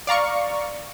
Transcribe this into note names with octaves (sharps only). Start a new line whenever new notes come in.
D5 F5 A#5 C#6